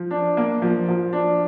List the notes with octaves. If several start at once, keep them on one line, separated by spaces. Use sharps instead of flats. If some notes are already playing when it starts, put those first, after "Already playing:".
Already playing: F3
D4
A#3
F3
F3
D4